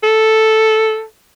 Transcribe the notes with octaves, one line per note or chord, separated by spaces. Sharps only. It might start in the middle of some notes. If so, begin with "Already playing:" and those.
A4